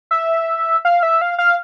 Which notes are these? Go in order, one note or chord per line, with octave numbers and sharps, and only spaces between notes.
E5
F5
E5
F5
F5